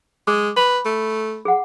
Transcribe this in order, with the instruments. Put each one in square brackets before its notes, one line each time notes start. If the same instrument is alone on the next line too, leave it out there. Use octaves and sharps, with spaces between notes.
[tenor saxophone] G#3 [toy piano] D6
[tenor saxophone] B4 [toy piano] B5
[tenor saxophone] A3
[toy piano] G#4 F#5